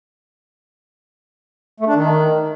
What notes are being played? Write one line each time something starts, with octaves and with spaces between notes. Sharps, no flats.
A3
D4
D#3